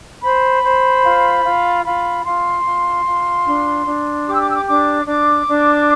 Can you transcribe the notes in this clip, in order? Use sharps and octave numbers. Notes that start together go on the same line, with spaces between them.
C5 B5
C5
F4
F4
F4 B5
F4 C6
F4
F4
D4
D4
G4 D6
E6
D6
E6
D6
D4 D6
D4 D6
D4